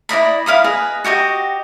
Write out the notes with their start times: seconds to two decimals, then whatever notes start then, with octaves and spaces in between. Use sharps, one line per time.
0.09 E4 D5 D#5 B5
0.46 E4 F5 B5 D#6
0.64 G#4 B4 D#5
1.04 F#4 G4 D#5 D#6